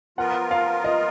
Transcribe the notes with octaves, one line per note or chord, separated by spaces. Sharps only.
F3 B3 F4 A#4 F#5
F5
D#5